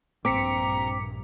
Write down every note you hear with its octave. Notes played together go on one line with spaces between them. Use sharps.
A#1 G2 C4 A#5 D6 B6 C#7